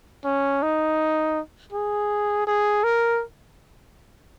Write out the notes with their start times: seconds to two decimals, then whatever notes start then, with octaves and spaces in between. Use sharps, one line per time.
0.25 C#4
0.62 D#4
1.73 G#4
2.47 G#4
2.84 A#4